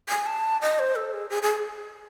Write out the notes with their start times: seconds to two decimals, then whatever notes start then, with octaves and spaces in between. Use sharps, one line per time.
0.09 G#5
0.26 A5
0.61 D#5
0.79 C5
0.96 A4
1.13 G#4
1.30 G#4
1.43 G#4